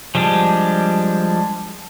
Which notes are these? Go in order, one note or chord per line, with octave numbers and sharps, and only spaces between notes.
F3 G3 G#3 D4